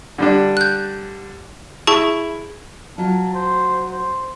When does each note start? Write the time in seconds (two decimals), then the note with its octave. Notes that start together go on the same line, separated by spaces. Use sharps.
0.18 D3 G3 D4
0.57 F#6 G6
1.87 E4 G#4 A5 C#6
2.98 F#3 F4 A5
3.34 C5
3.92 C5